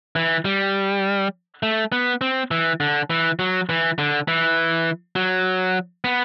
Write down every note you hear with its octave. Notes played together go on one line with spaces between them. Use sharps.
E3
G3
A3
B3
C4
E3
D3
E3
F#3
E3
D3
E3
F#3
B3